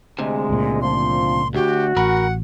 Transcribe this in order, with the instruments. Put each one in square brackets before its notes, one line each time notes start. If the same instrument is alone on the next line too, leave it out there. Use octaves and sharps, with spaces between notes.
[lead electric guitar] D2 C3 [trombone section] G#3
[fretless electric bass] C#2 A#2
[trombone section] F3 [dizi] C6
[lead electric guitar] D2 [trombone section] F#4 [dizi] G4
[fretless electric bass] A1 [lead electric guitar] A#4 B5 [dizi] F#5